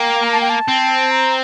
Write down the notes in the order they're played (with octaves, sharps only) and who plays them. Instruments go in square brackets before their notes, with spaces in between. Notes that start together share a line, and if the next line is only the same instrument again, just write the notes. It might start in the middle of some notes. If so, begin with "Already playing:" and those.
Already playing: [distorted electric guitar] A#3 [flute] G5
[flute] A#5
A5
G5
A5
[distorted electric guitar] C4
[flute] A#5